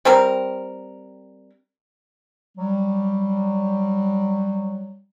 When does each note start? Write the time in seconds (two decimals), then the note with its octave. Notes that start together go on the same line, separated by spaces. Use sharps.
0.05 G3 C4 A#4
2.58 F#3 G3